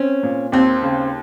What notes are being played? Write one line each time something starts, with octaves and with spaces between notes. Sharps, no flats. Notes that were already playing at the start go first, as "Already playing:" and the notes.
Already playing: C4 C#4
A#2
D#2 C4
C#3